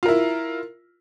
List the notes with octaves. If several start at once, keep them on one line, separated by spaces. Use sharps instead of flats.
E4 F4 A#4